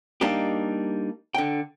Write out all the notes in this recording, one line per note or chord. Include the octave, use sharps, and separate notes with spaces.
G3 A#3 D4 D#4 G4
D3 G5